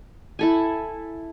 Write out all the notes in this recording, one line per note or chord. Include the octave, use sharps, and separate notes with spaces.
E4 A4 G#5